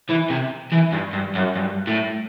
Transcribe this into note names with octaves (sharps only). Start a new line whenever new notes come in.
E3
C3
E3
G2
G2
F#2
G2
A2